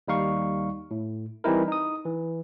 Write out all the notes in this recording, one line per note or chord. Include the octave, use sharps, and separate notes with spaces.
D#2 G3 D#4 F5 C#6
A2
E3 G3 C4 D#4 E4 A#4
D#4 D#6
E3